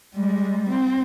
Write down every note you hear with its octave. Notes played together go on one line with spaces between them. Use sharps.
G3 G#3
C4